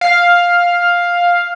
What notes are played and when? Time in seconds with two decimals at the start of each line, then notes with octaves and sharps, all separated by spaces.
0.01 F5